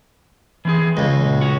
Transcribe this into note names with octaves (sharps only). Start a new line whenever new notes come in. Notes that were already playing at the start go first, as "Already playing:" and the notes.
E3 C4 G#4
C#2 D#5
A#2
C#4 F#4